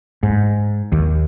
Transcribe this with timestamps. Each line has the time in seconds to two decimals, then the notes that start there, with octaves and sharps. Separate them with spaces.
0.23 G#2
0.92 D#2